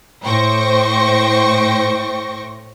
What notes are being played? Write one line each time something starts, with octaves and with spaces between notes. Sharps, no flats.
A2 C5 G5 C#6 A#6